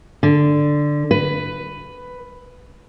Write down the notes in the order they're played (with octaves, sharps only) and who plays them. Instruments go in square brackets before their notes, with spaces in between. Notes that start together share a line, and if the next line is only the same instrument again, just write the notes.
[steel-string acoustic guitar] D3
B4